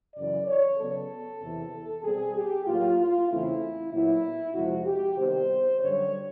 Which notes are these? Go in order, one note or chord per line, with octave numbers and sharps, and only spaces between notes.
F#2 C#3 E3 D5
C#5
C#3 F#3 B3 A4
E2 C3 E3
B2 G3 C4 G#4
G4
A2 F#3 A#3 F4
F4
E2 C#3 E3 A3 C4 E4
A#2 F#3 B3 E4
F2 C3 F3 G#3 C4 F#4
G4
C3 D#3 G3 B3 C5
F#2 D3 G3 C#5